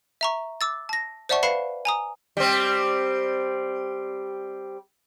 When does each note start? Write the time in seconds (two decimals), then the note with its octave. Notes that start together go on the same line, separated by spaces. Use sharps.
0.21 E5 A#5 C#6
0.61 D6 E6 A6
0.89 A5 A#6
1.29 C5 D5 E5 F#5 A5 C#6
1.43 B4 F5 B5 C7 C#7 E7
1.85 G#5 A#5 D#6
2.37 G3 C4